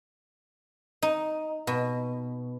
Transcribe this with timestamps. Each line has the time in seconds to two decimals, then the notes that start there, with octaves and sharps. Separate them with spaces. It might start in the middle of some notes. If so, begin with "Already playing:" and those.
1.02 D#4
1.67 B2